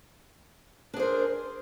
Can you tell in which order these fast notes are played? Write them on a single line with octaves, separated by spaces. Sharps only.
D4 G#4 C5 A#4